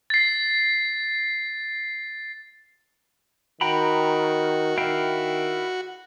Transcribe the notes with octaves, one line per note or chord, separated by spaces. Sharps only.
A6 C7
D#3 F#4 G5 A#5 B5
D#3 E4 F5 G5